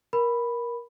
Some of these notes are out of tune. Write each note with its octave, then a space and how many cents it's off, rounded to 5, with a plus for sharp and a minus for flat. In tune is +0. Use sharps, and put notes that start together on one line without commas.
A#4 +20 B5 +0